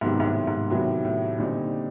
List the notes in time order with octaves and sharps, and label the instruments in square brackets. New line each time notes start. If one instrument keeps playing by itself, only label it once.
[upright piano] G#2 [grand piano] C3 D#3 F#3 B3
[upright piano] G#2
A2
G#2
[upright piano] A2 [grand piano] C3 D#3 F#3 B3
[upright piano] A2
[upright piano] A#2 [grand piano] D3 G3 C4 D#4